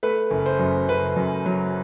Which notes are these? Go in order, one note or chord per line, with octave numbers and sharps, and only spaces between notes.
A3 B4
F#1
C5
F#2
F#1 B4
F#2
F#3